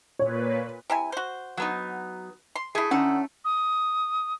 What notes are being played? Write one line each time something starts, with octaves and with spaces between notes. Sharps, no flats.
A#2 B4 C#5
C3 E4 G#5
F#4 C5
F#3 B3 D#4
C6
A3 E4 G#4
D3 C#4 D#4 F#5
D#6